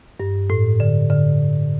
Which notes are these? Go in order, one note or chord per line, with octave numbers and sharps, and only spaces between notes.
G2
A2
D3
D3